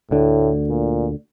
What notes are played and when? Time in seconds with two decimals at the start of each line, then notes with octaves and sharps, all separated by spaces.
0.11 D2 A2 D3
0.69 A#2